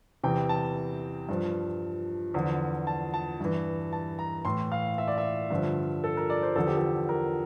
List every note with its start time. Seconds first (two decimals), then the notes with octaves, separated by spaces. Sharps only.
0.23 E2 C3 E3 G5
0.49 A5
1.29 G2 F3
2.34 E2 D3 F3
2.87 A5
3.14 A5
3.40 G2 E3
3.93 A5
4.19 A#5
4.45 A2 E3 C6
4.72 F5
4.98 E5
5.08 D5
5.18 E5
5.51 G2 D3 F3
6.04 A4
6.17 A#4
6.30 D5
6.43 C5
6.56 E2 D3 F3 A4
6.67 G4
6.77 A4
7.09 A#4